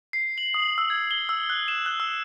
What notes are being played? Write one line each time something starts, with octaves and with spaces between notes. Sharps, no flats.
C7
F#7
D#6
E6
G#6
G7
E6
F#6
E7
F#6
E6